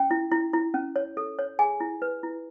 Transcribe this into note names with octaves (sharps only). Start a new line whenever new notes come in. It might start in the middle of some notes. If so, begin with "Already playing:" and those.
Already playing: C#4 G5
E4
E4
E4
C#4
C#5
A4
C#5
G#4 G#5
E4
B4
E4